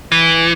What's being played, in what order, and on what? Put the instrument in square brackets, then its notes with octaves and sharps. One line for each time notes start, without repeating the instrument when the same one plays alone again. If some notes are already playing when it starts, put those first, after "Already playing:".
[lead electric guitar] E3